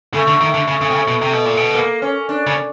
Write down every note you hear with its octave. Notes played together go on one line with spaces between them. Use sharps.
C#3 A3
D3
D#3
D3
C#3
C#3
C3
C#3
B2
C3
B2
A#2
B2
A#3
C#4
D4
C#3